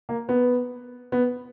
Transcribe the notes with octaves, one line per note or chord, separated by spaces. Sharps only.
A#3
B3
B3